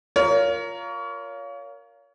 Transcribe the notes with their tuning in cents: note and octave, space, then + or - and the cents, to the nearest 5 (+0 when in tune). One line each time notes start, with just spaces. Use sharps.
F4 +0 A#4 +0 C#5 +30